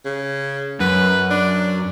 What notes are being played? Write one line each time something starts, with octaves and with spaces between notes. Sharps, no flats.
C#3
F#2 B4
D4